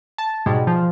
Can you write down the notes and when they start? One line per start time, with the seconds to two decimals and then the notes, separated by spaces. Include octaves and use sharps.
0.18 A5
0.46 G#2 B2 G3 G#3
0.67 F3